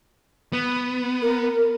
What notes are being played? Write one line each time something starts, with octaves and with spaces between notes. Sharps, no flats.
B3
A#4